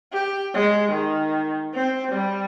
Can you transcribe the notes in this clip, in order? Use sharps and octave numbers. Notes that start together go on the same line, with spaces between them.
G4
G#3
D#3
C4
G3